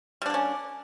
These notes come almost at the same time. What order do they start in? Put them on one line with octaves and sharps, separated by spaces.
G3 D4 A#3 C#4